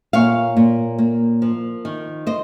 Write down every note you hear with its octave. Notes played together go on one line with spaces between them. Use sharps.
A#2 C#5 F5
A#2
A#3
F3
D#3
C5 D#5